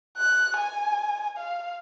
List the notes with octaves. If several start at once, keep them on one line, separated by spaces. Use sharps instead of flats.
F#6
G#5
F5